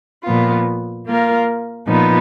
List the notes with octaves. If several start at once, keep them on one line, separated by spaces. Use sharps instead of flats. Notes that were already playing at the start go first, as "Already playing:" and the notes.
A#2 F3 B3 F4
A#3 F4 A#4
A#2 F3 B3 D#4